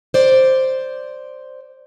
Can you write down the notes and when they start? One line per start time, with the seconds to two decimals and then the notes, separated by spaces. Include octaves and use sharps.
0.14 C5 D5